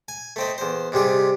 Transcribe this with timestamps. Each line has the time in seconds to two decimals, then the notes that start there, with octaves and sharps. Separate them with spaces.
0.08 G#5
0.36 A3 C4 D#5
0.58 E2 C5
0.92 G#2 C3 G3 G#4